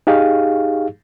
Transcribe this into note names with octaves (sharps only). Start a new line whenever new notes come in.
D#4 G4 G#4 F5